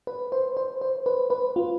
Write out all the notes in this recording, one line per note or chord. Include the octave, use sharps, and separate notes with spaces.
B4
C5
C5
C5
B4
B4
F4